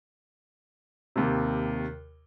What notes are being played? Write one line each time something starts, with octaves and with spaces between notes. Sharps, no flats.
D#2 C3